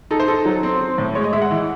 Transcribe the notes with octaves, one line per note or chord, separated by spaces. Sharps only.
D#4 A4
C5
D#4 A4
F#3
C4
C4
A2
G#3 C#5
D#5
G#3 E5
F#5
E3